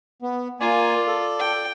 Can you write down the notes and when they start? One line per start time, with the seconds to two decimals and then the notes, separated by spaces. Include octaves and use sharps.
0.22 B3
0.60 A#3 F4 D5 G#5
1.07 A4
1.39 G5